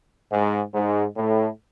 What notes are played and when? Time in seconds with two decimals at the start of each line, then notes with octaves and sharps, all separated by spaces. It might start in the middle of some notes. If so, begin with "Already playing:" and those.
0.31 G#2
0.74 G#2
1.17 A2